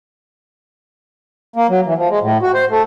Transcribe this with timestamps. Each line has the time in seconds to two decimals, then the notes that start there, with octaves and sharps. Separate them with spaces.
1.56 A#3
1.70 F#3
1.86 E3
1.98 F3
2.10 G#3
2.23 A2
2.42 F#4
2.54 C5
2.70 A3